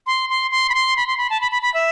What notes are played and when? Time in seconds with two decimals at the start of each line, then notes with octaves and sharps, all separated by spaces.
0.07 C6
0.30 C6
0.51 C6
0.70 B5
0.74 C6
0.97 B5
1.07 C6
1.18 B5
1.30 A5
1.41 B5
1.52 B5
1.62 B5
1.74 E5